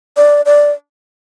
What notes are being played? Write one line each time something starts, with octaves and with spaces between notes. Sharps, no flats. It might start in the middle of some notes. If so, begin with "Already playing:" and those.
D5
D5